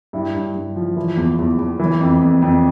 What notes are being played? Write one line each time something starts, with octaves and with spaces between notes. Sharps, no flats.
G2 E4
G2
G2
F3
E3
E2
E2
E2
E3
F2
F2
F2